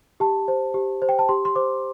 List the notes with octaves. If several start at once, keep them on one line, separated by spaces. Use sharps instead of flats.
G4 A5
C5
G4
C5
G5
A5
G4 C6
C6
C5 D6